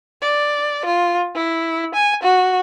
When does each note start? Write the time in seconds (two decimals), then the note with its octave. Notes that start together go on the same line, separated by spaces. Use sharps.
0.21 D5
0.85 F4
1.35 E4
1.95 G#5
2.23 F#4